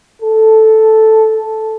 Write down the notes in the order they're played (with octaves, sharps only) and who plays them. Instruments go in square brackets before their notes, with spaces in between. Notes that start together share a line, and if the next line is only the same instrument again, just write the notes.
[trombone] A4